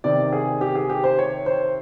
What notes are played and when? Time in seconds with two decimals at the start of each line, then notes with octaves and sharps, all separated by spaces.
0.04 C3 D#3 D5
0.32 G#4
0.61 G4
0.75 G#4
0.90 G4
1.04 C5
1.18 C#5
1.46 C5